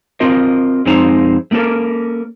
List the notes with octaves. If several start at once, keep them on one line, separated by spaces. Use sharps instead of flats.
C4 F4 A#4 D#5
F2 G#3 C4 D#4 C5 A#5
A3 A#3 C#4 A4 A#4